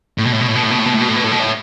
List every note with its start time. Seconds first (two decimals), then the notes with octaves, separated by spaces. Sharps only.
0.18 A2
0.25 B2
0.33 A2
0.40 B2
0.48 A2
0.55 B2
0.63 A2
0.71 B2
0.78 A2
0.85 B2
0.93 A2
1.01 B2
1.08 A2
1.16 B2
1.24 A2
1.32 B2
1.39 A2